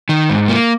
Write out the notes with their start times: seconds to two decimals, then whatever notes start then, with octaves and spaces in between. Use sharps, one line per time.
0.09 D#3
0.30 G#2
0.48 A#3